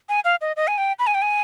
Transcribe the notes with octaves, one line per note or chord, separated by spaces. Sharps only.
G#5
F5
D#5
D#5
G#5
G5
B5
G#5
G5
G#5